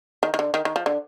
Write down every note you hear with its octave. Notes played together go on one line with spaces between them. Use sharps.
D#3
D#3
D3
D#3
D#3
F3
D3